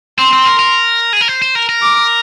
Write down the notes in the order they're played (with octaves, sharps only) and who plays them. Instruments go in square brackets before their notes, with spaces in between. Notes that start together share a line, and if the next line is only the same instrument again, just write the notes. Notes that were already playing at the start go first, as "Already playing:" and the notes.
[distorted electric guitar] C4 [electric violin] C6
[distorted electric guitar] C4
A#4
A#4
G#4
A#4
C5
C5
A#4
A#4
[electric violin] D6